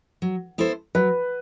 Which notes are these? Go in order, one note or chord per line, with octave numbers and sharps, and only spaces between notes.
F#3
B3 E4 A4 C5
F#3 B4